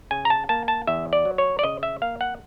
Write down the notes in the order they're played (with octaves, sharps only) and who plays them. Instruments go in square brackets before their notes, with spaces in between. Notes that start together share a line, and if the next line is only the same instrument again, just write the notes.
[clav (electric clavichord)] C#3 G#5
A#5
A5
A#3 A5
A5
E2 E5
D5
F#3
C#5
D5
C#3 D#5
E5
A#3 F5
F#5